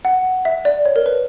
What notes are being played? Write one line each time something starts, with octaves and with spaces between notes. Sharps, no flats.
F#5
E5
D5
C#5
A#4
B4